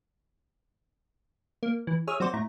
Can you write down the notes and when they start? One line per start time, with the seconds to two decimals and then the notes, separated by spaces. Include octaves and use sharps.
1.63 A#3
1.87 E3
2.07 G#4 C#5 E5 D#6 F6
2.20 F#3 C4 F#4 C5 D5
2.34 A2 E4 A#5